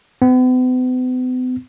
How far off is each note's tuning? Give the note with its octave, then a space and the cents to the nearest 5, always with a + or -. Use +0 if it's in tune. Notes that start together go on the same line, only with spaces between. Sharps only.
B3 +45